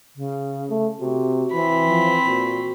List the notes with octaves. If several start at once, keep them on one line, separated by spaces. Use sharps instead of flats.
C#3
A3
C3 F#4
E3 C4 B5
F3
A#2 F#4